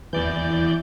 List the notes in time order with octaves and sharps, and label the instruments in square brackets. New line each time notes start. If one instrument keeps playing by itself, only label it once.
[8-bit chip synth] E2 D5 G6 [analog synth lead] E3